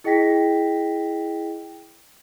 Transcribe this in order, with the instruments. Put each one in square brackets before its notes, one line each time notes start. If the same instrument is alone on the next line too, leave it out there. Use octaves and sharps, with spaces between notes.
[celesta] E4 G#4 D#5 G5 A#6 B6